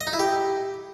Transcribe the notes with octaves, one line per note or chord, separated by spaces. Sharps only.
D#5
D#4
E4
G4